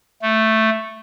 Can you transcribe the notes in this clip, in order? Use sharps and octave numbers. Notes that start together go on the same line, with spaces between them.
A3